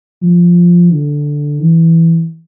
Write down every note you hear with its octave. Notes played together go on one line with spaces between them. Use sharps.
F3
D3
E3